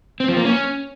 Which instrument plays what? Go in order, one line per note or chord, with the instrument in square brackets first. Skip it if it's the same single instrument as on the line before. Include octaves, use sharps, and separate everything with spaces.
[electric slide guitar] C4
F3
A#3
C#4